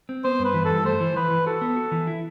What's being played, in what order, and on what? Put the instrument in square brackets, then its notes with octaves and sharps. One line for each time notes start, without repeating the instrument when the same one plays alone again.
[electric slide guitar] C4
[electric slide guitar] B3 [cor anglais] C5
[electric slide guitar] G2
[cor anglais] B4
[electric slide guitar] E3
[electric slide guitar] G2 [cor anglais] A4
[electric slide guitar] A3 [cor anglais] C5
[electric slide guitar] E3
[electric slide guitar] E3 [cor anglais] B4
[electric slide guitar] E3
[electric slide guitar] F#4 [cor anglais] A4
[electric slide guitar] B3
F#4
E3
E4